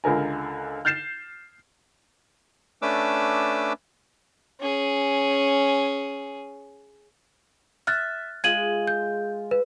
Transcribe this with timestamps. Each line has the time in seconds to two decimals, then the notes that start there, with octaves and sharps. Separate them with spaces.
0.04 C#2 D3 A#4 G#5
0.85 F6 G6 A6 C7 E7
2.82 A3 C#4 D4 B4 D6 E6
4.60 C#4 G#4
7.87 E5 F6 F#6 A6
8.44 G#3 F4 G#6 D#7 F#7
8.88 G6
9.51 B4